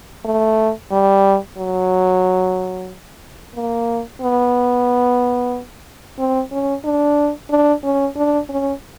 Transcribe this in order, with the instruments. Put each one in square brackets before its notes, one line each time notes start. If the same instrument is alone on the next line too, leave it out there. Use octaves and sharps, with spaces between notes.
[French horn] A3
G3
F#3
A#3
B3
C4
C#4
D4
D4
C#4
D4
C#4